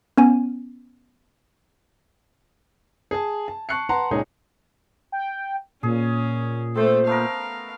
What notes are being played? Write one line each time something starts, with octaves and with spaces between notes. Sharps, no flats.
B3 C#4 G#5
G#4 A5
A5
A5 C#6 F#6 C7 C#7
B4 F#5 A5 A#5 C6
C#2 A#2 D#4 G#4 C#5
G5
A#2 C#4 G#4
A3 C4 A4 C5
A3 B3 A#4 F5